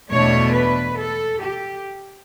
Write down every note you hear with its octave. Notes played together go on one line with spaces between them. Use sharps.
E2 B2 A3 D4 C#5
B4
A4
G4